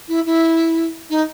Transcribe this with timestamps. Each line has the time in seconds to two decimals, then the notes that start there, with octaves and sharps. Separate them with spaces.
0.08 E4
0.26 E4
1.10 D#4